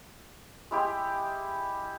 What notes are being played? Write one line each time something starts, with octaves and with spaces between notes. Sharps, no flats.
G#3 E4 G4